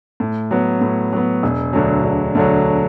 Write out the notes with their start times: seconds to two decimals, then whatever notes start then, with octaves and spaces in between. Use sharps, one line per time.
0.20 A2
0.51 F#3 B3
0.81 A2
1.13 F#3 B3
1.43 E1
1.73 D2 D3 F#3
2.04 E1
2.35 D2 D3 F#3